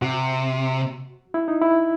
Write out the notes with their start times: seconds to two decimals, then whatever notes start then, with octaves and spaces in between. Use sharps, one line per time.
0.02 C3 F#4
1.34 E4
1.48 D#4
1.61 E4